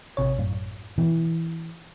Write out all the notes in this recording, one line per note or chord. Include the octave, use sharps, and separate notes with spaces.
A1 C3 C#5
F#2 A2
B2 E3